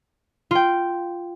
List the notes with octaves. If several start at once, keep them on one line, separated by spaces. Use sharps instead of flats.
F4 G5